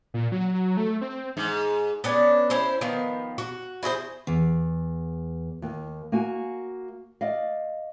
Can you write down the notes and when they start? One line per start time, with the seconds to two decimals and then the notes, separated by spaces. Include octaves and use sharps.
0.14 A#2
0.32 F#3
0.77 A3
1.01 C4
1.37 G#2
2.04 B3 C#4 D4
2.50 C#4 E4 C5
2.81 D#3 F3 B3
3.38 F#4
3.83 E4 F#4 G#4 C5
4.27 E2
5.62 D#2
6.12 A#3 F#4 G#5
7.21 D5 D#5 F5